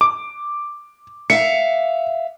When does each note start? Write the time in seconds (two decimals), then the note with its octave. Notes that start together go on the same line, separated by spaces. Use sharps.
0.01 D6
1.30 E5 F5 C#7